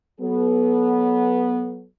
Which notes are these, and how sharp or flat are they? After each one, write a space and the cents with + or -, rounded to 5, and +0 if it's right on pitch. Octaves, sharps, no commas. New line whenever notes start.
F#3 +5 B3 -10 A4 -35